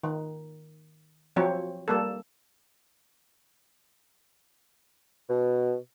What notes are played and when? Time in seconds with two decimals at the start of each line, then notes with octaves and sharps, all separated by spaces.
0.03 D#3
1.36 F3 F#3 C4 C#5
1.88 G3 A#3 A4
5.29 B2